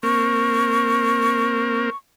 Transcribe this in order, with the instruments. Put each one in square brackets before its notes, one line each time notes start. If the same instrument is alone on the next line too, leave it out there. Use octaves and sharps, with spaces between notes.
[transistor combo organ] A#3 C4 A#4 [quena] C#6